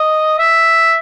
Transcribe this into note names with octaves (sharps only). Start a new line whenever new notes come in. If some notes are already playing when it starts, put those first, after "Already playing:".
Already playing: D#5
E5